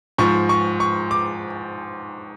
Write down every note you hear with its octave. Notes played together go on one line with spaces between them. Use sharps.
G#2 F3 C#6
C#6
C#6
D6